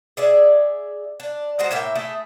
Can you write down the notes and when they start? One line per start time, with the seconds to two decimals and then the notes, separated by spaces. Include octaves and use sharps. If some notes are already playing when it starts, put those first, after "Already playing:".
0.17 G#4 D5 E5
1.20 D4
1.59 G#3 F#4 C5 A#5
1.71 A2 A#3 E5 G5
1.95 A3 E4 G#4